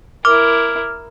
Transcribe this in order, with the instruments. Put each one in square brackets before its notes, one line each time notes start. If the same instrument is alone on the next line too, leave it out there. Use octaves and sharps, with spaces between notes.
[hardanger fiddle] E4 A#4 [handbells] D6 [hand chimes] F6